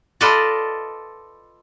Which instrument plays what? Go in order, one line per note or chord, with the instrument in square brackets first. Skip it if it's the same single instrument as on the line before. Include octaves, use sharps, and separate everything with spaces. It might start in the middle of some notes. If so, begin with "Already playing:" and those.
[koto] F4 A4 B4 D5 D#5